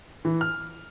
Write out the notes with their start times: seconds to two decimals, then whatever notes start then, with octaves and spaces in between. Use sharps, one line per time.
0.25 E3
0.41 F6